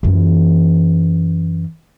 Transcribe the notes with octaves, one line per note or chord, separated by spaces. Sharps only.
F#2 E3